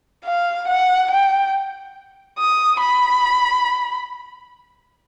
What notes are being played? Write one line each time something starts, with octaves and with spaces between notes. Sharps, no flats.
F5
F#5
G5
D#6
B5